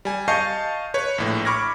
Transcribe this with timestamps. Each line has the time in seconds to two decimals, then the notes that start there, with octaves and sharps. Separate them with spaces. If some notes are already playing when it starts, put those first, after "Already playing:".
0.05 G3 G#5
0.28 D#5 F5 A5 C#6 G6 C7
0.94 B4 C#5
1.18 A#1 A2
1.45 B5 C#6 D6 F6 G#6 A#6